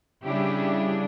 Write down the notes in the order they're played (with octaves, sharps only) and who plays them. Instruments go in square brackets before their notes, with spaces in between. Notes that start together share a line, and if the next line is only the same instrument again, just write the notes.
[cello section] C#3 G3 D4 E4 G4